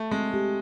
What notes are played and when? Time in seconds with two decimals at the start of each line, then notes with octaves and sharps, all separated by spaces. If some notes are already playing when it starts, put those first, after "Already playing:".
Already playing: A3
0.11 G#3 C4
0.34 G4